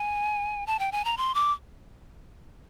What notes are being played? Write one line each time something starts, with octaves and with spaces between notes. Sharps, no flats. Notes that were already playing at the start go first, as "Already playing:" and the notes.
Already playing: G#5
A5
G5
G#5
A#5
C6
D6